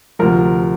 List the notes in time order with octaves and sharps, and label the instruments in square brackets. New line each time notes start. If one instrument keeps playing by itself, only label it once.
[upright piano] D2 C3 F3 A#4